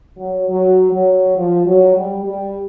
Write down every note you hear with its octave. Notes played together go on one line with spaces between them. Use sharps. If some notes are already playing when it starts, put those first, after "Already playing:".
F#3
F#3
F#3
F3
F#3
G3
G3